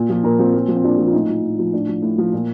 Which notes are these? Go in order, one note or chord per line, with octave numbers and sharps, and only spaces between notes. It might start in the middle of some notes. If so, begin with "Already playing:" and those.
Already playing: A#2
F3
A#2 A#4
F3 C4
A#2
F3
C4
A#2 D4
F3
F4
A2 D#4
F3
A2
F3
A2 D4
F3
A2
F3
A#2